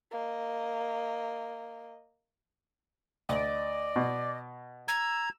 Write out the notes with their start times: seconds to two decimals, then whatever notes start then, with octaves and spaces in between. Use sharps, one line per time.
0.11 A#3 D#5
3.29 D2 D5 D#5
3.96 B2
4.88 A#5 E6 G#6